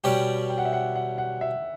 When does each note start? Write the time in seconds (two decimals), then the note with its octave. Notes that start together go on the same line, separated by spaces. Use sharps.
0.04 B2 G3 C#4 G4 D5 G5
0.50 G5
0.58 F#5
0.65 E5
0.73 F#5
0.95 F#5
1.18 F#5
1.41 E5